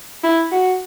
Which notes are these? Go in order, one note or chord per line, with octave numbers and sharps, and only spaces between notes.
E4
F#4